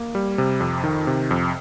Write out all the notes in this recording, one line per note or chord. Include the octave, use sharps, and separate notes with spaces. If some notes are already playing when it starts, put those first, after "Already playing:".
Already playing: A#3
G3
C3
F2
D#3
C3
F2